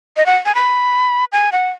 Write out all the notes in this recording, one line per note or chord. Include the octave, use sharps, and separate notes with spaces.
D#5
F#5
G#5
B5
G#5
F#5